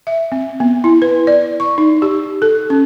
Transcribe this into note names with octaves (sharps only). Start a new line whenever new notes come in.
E5
C4
B3
E4
B4
D5
C#6
D#4
G4
A4
C#4